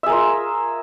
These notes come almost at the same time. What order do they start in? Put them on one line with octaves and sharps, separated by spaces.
E5 G#4 A#4 F4